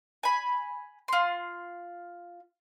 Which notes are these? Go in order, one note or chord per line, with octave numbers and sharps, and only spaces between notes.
G#5 B5
F4 C6